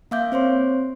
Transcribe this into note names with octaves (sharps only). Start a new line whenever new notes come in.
A#3 E5 F5 D6 G6
C4 C5 C#5 C6